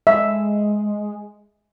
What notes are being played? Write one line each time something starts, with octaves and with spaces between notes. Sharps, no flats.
G#3 E5